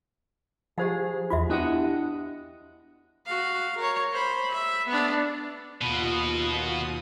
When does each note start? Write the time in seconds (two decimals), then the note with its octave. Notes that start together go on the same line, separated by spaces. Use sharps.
0.78 F3 G4 G#4 C5 F5
1.30 E2 F4 F#4 E5 B5
1.50 B3 D4 E4 G4 D#5 F#5
3.27 F#4 F5
3.77 A#4 C#5
4.12 C5 B5
4.51 E5
4.88 B3 D4
5.81 D#2 B2 F4 D#6